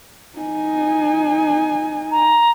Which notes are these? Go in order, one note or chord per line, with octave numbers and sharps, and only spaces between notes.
D#4 G#5
A#5